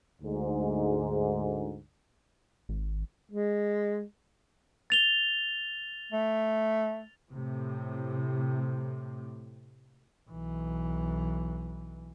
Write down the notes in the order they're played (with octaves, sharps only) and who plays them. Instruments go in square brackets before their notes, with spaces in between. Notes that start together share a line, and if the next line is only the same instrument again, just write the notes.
[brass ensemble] D2 G#2
[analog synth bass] G#1
[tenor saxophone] G#3
[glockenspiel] A6 F7 G7
[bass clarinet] A3
[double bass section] A2 C3
[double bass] B1 E3